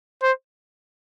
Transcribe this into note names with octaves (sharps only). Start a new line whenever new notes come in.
C5